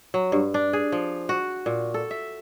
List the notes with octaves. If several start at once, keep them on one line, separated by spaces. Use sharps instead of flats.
F#3
G2
D4
G#4
F3
F#4
A#2
A4
E5